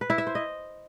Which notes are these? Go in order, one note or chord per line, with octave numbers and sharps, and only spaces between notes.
B4
E4
E5
C5
D#5